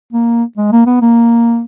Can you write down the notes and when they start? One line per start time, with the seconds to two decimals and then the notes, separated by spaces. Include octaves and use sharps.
0.13 A#3
0.58 G#3
0.72 A#3
0.87 B3
1.01 A#3